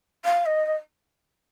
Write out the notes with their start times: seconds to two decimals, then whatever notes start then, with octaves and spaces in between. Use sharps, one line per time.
0.25 F5
0.46 D#5
0.66 D#5